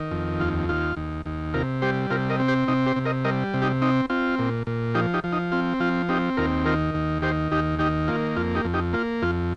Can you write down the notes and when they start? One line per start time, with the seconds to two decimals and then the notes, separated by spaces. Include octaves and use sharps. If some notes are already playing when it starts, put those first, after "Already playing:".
Already playing: D#3
0.11 F2
0.40 D#2 F4
0.69 D#2 F4
0.97 D#2
1.26 D#2
1.54 C3 F4 A#4
1.82 G3 G4 C5
2.10 C3 F4 A#4
2.30 A#4 D#5
2.40 C4
2.48 G4 C5
2.68 C3 D#4
2.86 G4 C5
2.96 C3
3.05 A#4 D#5
3.25 G3 A#4 D#5
3.54 C3
3.62 D#4 G4
3.82 C4 D#4
4.10 C4 F4
4.39 A#2
4.67 A#2
4.95 F3 D#4 G4
5.14 D#4 G4
5.24 F3
5.33 D#4
5.52 C4 F4
5.80 F3 F4
6.09 C4 D#4 G4
6.37 D#2 F4 A#4
6.65 D#3 F4 A#4
6.94 D#2
7.22 D#3 G4 C5
7.52 D#2 D#4 G4
7.79 D#3 D#4 G4
8.08 A#3 F4
8.36 F2 F4
8.55 D#4 G4
8.64 F2
8.74 D#4 G4
8.93 A#3 F4
9.22 F2 F4